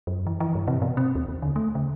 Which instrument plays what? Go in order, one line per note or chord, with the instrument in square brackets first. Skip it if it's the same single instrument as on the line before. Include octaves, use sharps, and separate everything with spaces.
[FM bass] F#2
E3
E3
G2
C3
B2
C4
D#2
D#2
D3
A3
C#3